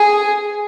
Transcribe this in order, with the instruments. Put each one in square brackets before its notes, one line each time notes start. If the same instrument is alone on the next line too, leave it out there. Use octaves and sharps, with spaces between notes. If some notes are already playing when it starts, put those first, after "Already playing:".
Already playing: [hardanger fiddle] G#4